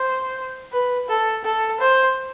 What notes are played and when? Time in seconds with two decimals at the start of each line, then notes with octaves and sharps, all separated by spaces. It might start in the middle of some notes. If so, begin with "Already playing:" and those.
Already playing: C5
0.72 B4
1.08 A4
1.44 A4
1.80 C5